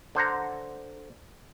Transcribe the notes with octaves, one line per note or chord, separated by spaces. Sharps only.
D3 C5 F#5 A#5